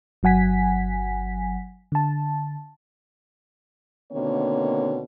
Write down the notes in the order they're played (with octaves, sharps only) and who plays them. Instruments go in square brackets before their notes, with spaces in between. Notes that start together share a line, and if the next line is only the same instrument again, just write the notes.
[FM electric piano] G1 F#3 F#5 G#5 B6
D3 A5
[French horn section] B2 D3 D#3 A#3 C4 C#5